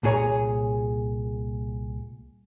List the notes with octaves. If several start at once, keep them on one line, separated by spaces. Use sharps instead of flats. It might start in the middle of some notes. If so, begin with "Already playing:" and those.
C2 A#2 G#4 C#5 A#5